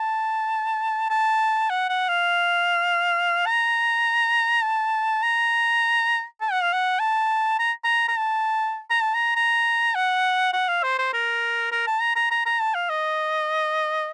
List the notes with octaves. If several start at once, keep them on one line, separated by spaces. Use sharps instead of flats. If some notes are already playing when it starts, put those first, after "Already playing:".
Already playing: A5
A5
F#5
F#5
F5
A#5
A5
A#5
A5
F#5
F5
F#5
A5
A#5
A#5
A#5
A5
A#5
A5
A#5
A#5
F#5
F#5
F5
C5
C5
A#4
A#4
A5
A#5
A#5
A#5
A#5
A5
F5
D#5